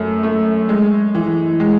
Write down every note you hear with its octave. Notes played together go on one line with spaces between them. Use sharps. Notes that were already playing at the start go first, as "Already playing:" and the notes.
Already playing: F#2 A3
A3
G#3
E3
G#3